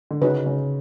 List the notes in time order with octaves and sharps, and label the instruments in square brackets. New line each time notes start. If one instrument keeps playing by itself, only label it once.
[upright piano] D3
[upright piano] C#3 [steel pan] D#4 F#4 B4
[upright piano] C#3